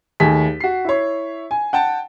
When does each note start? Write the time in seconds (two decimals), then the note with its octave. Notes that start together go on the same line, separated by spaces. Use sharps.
0.20 D#2 A3 G#4 B6
0.60 F#4 C7
0.85 E4 C#5
1.51 G#5
1.73 F#5 G5 A5